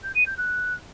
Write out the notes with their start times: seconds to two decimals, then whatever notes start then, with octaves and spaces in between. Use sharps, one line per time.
0.03 G6
0.14 D#7
0.26 G6
0.37 F#6